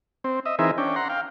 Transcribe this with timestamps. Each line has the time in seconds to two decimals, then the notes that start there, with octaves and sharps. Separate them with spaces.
0.24 C4
0.46 D#5 E5
0.59 E3 C4 D#4 G#4 A#4 E5
0.78 C#4 D4 G5
0.96 F#5 A#5 C6
1.09 F5 G5